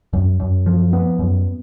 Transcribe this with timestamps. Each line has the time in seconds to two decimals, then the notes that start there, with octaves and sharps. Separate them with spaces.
0.13 F#2
0.40 F#2
0.66 F3
0.93 B3
1.19 F#2